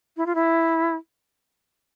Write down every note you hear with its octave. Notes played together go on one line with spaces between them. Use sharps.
E4
F4
E4